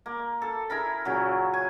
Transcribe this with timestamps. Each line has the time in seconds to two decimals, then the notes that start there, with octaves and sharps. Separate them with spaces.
0.06 A#3
0.42 A4
0.70 E4 G#4 A#4 B5
1.05 A#2 C#3 F#3
1.54 G#5